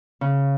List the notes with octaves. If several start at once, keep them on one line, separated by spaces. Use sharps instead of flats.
C#3